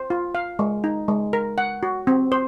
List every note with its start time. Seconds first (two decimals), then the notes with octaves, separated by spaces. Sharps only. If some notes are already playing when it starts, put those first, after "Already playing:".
Already playing: C5
0.10 F4
0.35 F5
0.59 G#3
0.84 D#4
1.08 G#3
1.33 A#4
1.58 F#5
1.83 F#4
2.07 C4
2.32 C5